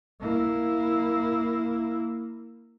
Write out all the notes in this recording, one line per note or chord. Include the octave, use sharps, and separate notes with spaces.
A#3 E4